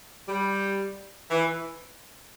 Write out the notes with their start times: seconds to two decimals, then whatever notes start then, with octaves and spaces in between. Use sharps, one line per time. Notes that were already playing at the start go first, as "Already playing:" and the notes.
0.27 G3
1.31 E3